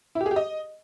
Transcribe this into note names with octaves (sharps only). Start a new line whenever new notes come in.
E4
G4
G#4
G4
D#5